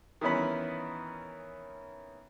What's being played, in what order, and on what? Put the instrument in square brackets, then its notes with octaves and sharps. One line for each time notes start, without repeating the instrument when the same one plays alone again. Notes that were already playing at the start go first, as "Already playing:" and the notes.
[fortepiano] D#3 E3 B3 C#4 B5